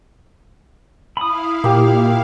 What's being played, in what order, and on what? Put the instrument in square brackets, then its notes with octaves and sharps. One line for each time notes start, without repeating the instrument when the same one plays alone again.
[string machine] E4 F5 [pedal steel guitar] B5 D#6
[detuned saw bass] A#2 [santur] A#3 G4